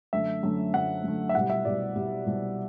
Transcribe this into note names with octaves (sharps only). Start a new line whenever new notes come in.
F#2 D3 A3 E5
F#2 D3 A3
F#2 D3 A3 F#5
F#2 D3 A3
E5
C2 B2 G3 F#5
E5
C2 B2 G3 D5
C2 B2 G3
C2 B2 G3